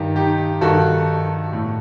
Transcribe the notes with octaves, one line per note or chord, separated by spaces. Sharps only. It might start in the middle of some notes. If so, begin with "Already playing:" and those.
Already playing: G2 D#3 D#4 G4
D#4 G4
G2 D#3 F#4 A4
A2